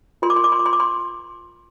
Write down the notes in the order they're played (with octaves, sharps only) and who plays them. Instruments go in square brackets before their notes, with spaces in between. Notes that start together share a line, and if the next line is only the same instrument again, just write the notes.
[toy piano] F4 A#4 C6
D6
C6
D6
C6
D6
C6
D6
C6